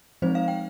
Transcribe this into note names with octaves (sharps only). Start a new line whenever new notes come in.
F3 G#3 C4 D#4 C5
F5
G5